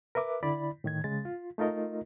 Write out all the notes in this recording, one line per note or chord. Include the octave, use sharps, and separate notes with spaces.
A#4 B4 E5 D6
D3 E4 D5 B5
A2 D#3 G#6
C#3 G#3 A6
F4
A3 D#4 F4 A#4 D#5